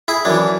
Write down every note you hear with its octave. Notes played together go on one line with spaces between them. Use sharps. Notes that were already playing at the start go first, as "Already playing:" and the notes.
E4 G#4
F#2 E3 D4